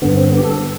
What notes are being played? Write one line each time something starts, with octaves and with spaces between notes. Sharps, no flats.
G2 D3 B3
C4
B3
G4
A4